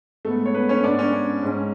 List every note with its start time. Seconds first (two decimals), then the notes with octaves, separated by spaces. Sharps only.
0.25 G#2 G#3 A3 B3 A4
0.46 C#5
0.54 B3 B4
0.69 C#4 C#5
0.84 G#2 G#3 B3 D4 D5
0.98 C#4 C#5
1.43 G#2 G#3 C#4